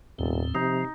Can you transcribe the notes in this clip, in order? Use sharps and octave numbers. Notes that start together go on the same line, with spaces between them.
E1 D#2 A2 C4
C3 F3 D#4